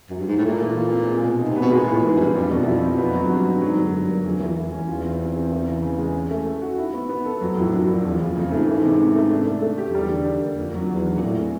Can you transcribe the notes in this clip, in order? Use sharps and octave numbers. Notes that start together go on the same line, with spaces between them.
F#2
G2
G#2
A2
A#2 A3
E3
F4
C4
G#3
B2
D#4
C3
B3
B2
A#2 G#3
A2 E3
G#2 E3
F#2
G2 C4
F2 G3
B2
F#2
F2 E4
C4
F2 B3
F#3
G#2
G2 F#4
D4
G#2 F#3
F#2 D3
D3
G2
A#3
F2 G#3
E2 E3
E3
E2
C#4
E2 F4
C4
C4
G#4
E3
C#3
C#3
G#3
C#4
A3
A4
F#4
E4
B3
B3
A4
F2 F#3
F#2
F2 A2
F#2 D4
F2 A#3
E2 F3
F2 C#3
E2
F2 C#3
G#2 A3
G#2 E3
C3
C3
A3
D4
A3
A3
G4
F2
E2 G3
D3
D4
A#3
F2 A#3
F#3
E2 F#4
D4
A#2
A2 C4
G#3